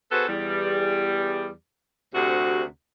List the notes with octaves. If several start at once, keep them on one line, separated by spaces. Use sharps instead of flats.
B3 F#4 G#4 A4 B4 C5
E2 G3
D2 C3 F#4